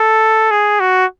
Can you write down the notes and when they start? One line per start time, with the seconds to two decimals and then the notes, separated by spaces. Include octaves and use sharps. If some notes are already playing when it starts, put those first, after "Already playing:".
Already playing: A4
0.51 G#4
0.80 F#4